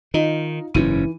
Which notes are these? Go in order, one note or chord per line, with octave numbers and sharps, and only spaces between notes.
D#3 D#4 F4 D#5
F#1 G#2 E3 C#4 D#7